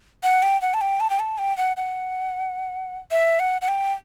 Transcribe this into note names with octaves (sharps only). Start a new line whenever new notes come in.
F#5
G5
F#5
A5
G5
A5
G5
A5
G5
F#5
F#5
E5
F#5
F#5
G5